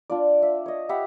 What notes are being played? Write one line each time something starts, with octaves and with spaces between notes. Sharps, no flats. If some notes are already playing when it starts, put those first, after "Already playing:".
D4 F4 D5
E5
C#5 D#5
G4 E5 F#5 B5